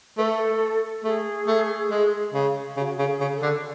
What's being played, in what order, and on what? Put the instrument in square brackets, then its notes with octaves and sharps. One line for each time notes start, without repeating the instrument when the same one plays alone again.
[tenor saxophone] A3 [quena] A4 B4
[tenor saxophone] A3 [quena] G#4
[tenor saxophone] A3
G#3
C#3
[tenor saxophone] C#3 [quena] G#4
[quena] F#4
[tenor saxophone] C#3
[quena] A4
G#4
[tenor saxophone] C#3
[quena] A4
[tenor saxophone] D3